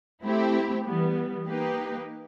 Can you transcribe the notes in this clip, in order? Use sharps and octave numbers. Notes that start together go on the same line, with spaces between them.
A3 C4 E4 G4
E3 G3 B3
A#3 D#4 G4 B4